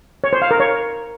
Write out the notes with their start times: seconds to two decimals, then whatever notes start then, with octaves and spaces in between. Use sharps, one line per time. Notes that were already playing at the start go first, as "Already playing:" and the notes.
0.24 C#5
0.33 C5
0.42 F5
0.51 A#4
0.60 C#5